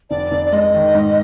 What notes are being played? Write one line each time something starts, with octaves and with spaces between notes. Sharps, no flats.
F1 D5
F1
D5
G#3 D#5
D#3
G#2